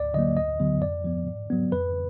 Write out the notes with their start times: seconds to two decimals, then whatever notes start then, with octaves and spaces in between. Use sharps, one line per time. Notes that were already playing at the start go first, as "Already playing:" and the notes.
Already playing: D2 D5
0.14 D3 F#3 A#3 D#5
0.37 D2 D#5
0.59 D3 F#3 B3
0.82 F2 D5
1.04 F3 B3
1.27 G#2
1.50 F#3 B3
1.72 F2 B4